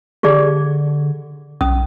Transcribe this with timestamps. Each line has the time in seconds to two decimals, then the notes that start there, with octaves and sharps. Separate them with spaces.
0.23 D3 G4 G#4 D5
1.61 B1 C#4 D#6